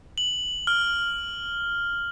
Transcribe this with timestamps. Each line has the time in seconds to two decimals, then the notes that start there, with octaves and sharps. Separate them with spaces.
0.18 F#7
0.67 F6